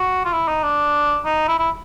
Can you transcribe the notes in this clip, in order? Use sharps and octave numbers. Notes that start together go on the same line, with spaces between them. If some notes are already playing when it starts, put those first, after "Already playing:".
Already playing: F#4
F4
E4
D#4
D4
D#4
E4
E4